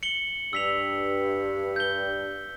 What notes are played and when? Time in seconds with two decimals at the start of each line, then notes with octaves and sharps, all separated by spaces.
0.03 C#7 F#7 G7
0.53 G2 E6 B6 F7
1.76 G6 G7